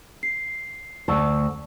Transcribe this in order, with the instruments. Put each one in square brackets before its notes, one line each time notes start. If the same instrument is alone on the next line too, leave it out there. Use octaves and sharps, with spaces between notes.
[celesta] C7
[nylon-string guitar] D2 A5 [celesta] D5 C#6 E6